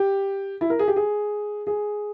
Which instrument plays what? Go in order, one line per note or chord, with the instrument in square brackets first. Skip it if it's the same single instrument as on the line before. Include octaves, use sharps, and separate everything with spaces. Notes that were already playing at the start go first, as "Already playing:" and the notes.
Already playing: [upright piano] G4
E4
A#4
G#4
G4
G#4
G#4